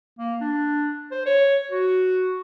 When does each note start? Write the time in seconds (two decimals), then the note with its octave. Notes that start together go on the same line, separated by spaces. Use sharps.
0.19 A#3
0.41 D4
1.11 C5
1.26 C#5
1.71 F#4